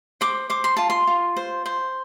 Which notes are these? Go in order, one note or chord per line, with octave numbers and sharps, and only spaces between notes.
C5 D6
C5 D6
C6
F4 A5
C6
F4
C5
C5